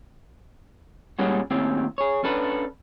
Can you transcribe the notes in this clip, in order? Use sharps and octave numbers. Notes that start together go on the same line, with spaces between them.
A#2 G3 G#3 C#4 F#4
D#2 A2 C4 C#4 G4
G#4 C#5
C#4 D4 A4 B4